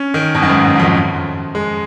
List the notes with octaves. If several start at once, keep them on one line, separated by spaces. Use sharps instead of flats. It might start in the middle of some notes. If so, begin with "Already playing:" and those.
Already playing: C#4
D#3
B2
F#2
G#2
F#2
F#2
F2
G#3